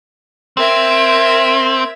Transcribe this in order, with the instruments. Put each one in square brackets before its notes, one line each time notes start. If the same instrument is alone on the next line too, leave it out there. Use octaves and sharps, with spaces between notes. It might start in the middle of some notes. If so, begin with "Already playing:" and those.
[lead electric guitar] C4 [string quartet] A#4 E5 G#6